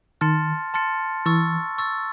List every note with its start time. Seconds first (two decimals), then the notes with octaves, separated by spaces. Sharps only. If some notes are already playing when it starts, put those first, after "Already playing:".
0.21 D#3 A5 C6 F6 A6 C#7
0.74 A5 C6 F6 A6 C#7
1.26 E3 C#6 E6 A6
1.78 C#6 E6 A6